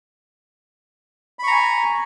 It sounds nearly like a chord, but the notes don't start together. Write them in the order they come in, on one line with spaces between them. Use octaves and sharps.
B5 C#6 A#5 G#5